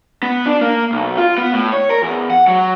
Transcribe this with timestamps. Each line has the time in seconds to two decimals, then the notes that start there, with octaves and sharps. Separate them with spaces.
0.23 B3
0.46 D4
0.61 A#3
0.92 B1
1.18 F4
1.38 B3
1.54 A2
1.73 C#5
1.91 A#4
2.02 E2
2.30 F#5
2.48 F#3